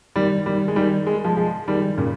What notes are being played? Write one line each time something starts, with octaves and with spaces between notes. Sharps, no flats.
D#3 G3
D#3 G3
G#3
D#3 G3
G#3
F3 G#3
F3 G#3
D#3 G3
A#2 C#3